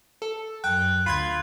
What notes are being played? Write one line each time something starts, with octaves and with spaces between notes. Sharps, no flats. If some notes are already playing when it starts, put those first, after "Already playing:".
A4
F#2 G5 F#6
D2 F4 B5 C6 G#6